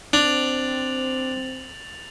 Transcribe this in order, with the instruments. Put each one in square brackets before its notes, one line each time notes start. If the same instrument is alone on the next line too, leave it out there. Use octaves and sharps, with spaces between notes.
[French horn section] C4 [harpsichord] D4 [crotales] A6 F7 F#7